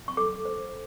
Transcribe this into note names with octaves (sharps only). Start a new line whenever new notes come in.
C#6
A4 D6
C5